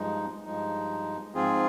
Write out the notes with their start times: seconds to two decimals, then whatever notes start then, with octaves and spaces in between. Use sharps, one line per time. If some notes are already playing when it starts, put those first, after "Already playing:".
Already playing: G2 F3 G#3 D#4
0.45 G2 F3 G#3 D#4
1.34 G#2 F3 C4 F4 G#4